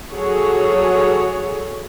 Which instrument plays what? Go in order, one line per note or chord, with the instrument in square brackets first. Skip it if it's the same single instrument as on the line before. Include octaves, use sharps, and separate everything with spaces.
[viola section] F#3 F#4 G#4 A4 C#5